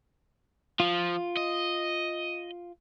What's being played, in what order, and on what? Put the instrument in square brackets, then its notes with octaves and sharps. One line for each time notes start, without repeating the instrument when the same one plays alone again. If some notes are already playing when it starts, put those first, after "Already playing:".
[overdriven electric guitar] F3 [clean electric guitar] F4
[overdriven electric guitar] D#5